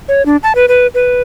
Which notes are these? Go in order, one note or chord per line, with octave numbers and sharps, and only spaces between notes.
C#5
D4
A5
B4
B4
B4